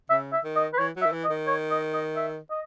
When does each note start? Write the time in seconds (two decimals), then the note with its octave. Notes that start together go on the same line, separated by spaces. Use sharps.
0.10 C#3 E5
0.32 E5
0.44 D#3
0.56 D#5
0.73 B4
0.78 E3 C#5
0.96 F#3
1.02 E5
1.06 D#3
1.12 E3
1.24 D#5
1.30 D#3
1.47 C#5
1.70 D#5
1.93 D#5
2.16 E5
2.50 D#5